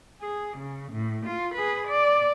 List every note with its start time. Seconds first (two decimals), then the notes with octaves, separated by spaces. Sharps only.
0.22 G#4
0.58 C#3
0.92 A2
1.26 F4
1.55 G#4 B4
1.88 D5